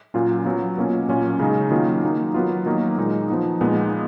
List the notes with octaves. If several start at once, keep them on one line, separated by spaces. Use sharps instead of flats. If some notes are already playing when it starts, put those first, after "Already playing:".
A#2 F#3 C#4 F4
F#3 B3 F4
B2 A#3 C#4 F4
A#2 F#3 C#4 F4
C#3 G#3 D#4
D#3 F#3 A#3 F4
F#3 A#3 D#4
F#3 B3 F4
D#3 F#3 A#3 D#4
A#2 G#3 D#4
F3 B3 D#4
A#2 G#3 B3 D#4